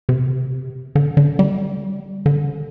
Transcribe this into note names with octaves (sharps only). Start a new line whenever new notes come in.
C3
D3
D3
G3
D3